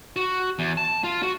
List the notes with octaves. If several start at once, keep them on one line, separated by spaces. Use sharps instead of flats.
F#4
E2
A5
F4
F#4